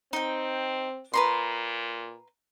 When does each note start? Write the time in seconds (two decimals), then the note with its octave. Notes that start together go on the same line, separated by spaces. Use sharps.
0.13 C4 D#4 G5
1.13 A#2 B4 A#5 C6